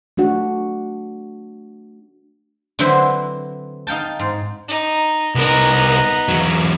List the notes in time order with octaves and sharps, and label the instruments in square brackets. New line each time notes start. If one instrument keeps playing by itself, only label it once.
[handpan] A3 D4 F#4 F#5
[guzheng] D3 F#3 C4 E4 B4 C5
D#4 F5 G5 A5
G#2
[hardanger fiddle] D#4
[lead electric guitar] C2 A#4 [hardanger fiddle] B3 D#4
[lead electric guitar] E2 F#3